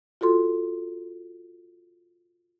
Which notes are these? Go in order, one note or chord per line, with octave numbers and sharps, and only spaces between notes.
F4 F#4 A4 C6